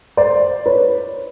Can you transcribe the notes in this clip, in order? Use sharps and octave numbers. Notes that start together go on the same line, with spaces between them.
C5 D5
B4 C#5